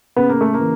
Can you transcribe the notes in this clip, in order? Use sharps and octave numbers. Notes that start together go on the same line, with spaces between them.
C#3 B3
A#3
A3
A#3
E3